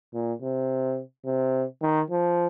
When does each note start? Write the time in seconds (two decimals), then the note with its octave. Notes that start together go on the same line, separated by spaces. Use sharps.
0.14 A#2
0.42 C3
1.25 C3
1.82 D#3
2.10 F3